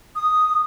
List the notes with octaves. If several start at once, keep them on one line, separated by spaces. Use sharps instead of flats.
D#6